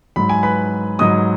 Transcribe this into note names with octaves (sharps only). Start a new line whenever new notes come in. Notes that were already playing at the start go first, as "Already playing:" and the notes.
G#2 F#3 B5
G#5
B4 B5
G#2 F#3 D#5 D#6